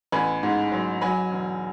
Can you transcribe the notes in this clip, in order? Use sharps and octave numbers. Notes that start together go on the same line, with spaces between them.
A1 G#5 B5
G#2
F#3
F#3 G#5 B5
E1